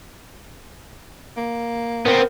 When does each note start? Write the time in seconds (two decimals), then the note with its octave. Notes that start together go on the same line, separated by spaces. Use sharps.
1.37 A#3
2.05 B3 C4 A#4